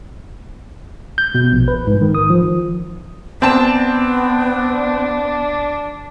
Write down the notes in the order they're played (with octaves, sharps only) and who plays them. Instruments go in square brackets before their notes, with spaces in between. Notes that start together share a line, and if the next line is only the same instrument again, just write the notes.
[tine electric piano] G6
B2
A#1
B4
G#2
D#3
D#6
F3
[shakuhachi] B3 [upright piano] C4 A5 E7 [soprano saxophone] D4